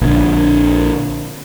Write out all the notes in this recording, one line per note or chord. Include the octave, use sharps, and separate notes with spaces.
A#1 D3